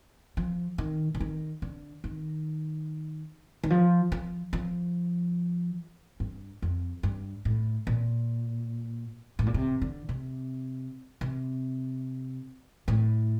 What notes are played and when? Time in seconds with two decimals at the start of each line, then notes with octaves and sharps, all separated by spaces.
0.37 F3
0.78 D#3
1.15 D3
1.20 D#3
1.62 D3
2.04 D#3
3.63 D#3
3.70 F3
4.12 F3
4.53 F3
6.20 G2
6.62 F2
7.03 G2
7.45 A2
7.87 A#2
9.39 A2
9.46 A#2
9.54 C3
9.82 D3
10.09 C3
11.21 C3
12.88 A2